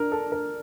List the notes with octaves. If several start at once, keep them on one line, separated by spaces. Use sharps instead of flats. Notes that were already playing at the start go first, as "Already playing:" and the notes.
Already playing: D4 A#4
A4
A#4